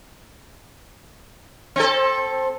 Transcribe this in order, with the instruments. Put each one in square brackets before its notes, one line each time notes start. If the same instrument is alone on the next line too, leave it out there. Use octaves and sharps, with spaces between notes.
[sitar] C4 A4